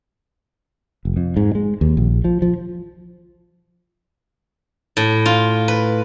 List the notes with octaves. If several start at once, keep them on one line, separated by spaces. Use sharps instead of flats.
F1
F2
G#2
G#3
D#2
A#1
F3
F3
A2
F4
B4